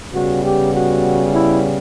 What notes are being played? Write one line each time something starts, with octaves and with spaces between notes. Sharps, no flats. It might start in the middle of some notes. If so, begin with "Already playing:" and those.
C#3 G3 B3 F#4
G4
F#4
E4